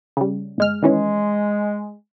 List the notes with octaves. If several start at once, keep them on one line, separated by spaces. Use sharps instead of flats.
C#3 G3
G1 G#3 F6
D#3 E3 G#3 C#4